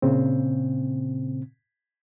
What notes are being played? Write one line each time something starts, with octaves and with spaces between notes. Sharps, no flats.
A#2 C#3 C4